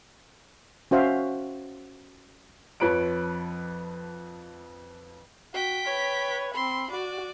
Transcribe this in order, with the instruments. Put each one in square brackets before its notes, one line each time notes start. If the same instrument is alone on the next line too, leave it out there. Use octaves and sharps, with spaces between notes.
[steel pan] C#4 F#4 C5 E5 F5
[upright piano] F2 F3 B4 C#5 D7
[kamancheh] F#4 [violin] G5 B6
[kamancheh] B4 C#5
[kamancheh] C4 B5 [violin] C6
[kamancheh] F#4 [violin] D5